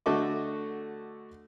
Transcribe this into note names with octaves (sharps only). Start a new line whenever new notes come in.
D3 A3 F#4 D#5 D6